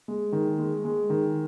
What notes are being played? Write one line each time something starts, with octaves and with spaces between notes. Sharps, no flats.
G#3
D#3
G#3
G#3
D#3